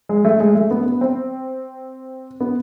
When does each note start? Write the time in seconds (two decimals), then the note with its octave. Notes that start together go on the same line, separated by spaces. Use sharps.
0.09 G#3
0.25 A3
0.40 G#3
0.55 A3
0.71 B3
0.86 B3
1.01 C4
2.40 B3